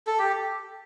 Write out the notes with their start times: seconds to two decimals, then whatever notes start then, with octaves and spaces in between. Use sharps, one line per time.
0.07 A4
0.19 G4